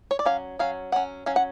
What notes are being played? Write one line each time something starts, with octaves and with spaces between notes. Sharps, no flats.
C#5
D5
F#3 C#4 F5
F#3 C#4 F5
F#3 C#4 F#5
F#3 C#4 F5
F#5